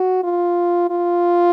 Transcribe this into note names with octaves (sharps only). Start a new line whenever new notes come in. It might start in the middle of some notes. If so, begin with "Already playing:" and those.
Already playing: F#4
F4
F4